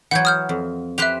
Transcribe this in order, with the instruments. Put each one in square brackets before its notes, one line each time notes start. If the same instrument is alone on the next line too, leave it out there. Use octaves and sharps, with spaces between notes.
[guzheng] E3 F#3 [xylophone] F#5 G6 G#6
[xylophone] D#6 F6 G6
[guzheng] F2
[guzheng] G4 B4 C5 [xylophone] E5 F#6 F7